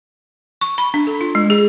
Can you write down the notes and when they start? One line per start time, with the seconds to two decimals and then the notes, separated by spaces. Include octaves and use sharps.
0.61 C#6
0.78 B5
0.94 D4
1.07 A4
1.21 F4
1.35 G#3
1.50 G#4